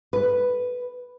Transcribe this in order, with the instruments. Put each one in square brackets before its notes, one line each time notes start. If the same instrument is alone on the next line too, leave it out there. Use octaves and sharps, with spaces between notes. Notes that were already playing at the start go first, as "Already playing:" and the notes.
[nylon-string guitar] B4